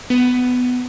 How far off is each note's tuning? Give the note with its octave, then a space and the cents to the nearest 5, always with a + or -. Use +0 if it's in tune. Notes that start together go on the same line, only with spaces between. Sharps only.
B3 +15